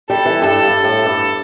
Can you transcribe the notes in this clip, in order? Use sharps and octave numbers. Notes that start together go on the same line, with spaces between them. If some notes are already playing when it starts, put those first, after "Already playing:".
G3 A4
E3
G2 A4
G2
A2
G2